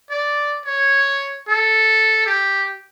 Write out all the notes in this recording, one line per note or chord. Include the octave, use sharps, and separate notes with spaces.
D5
C#5
A4
G4